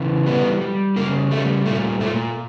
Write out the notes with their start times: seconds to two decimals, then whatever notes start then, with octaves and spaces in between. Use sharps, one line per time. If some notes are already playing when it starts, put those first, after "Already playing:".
Already playing: C#3 E3
0.26 G3 B3
0.61 G3
0.96 C#3 A#3
1.31 G3 A3
1.66 A#2 A3
2.00 A#2 A3